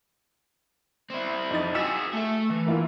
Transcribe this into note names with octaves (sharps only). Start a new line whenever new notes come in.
C4 E4
F2 D#4 A6
F#4 G#4 E6 B6 E7
A3 E5
E3
A#3 E4 F4